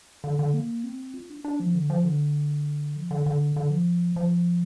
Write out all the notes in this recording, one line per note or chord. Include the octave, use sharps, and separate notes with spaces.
D3
D3
A#3
C4
F4
D4
D4
F3
D3
F3
D3
F3
D3
D3
D3
F3
F3